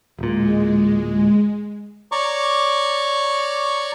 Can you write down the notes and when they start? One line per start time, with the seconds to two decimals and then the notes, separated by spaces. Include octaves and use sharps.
0.19 D1 A#2 G#3
2.12 C#5 D5 A#5 C#6 D6